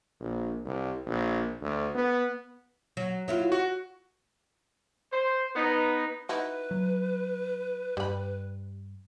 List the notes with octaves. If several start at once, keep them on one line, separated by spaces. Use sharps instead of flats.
A#1
C2
A#1
D2
B3
F#3
F#3 E4 F4
F#4
C5
B3 D#4
D#4 E4 F#4 B4
F#3
G2 G3 B5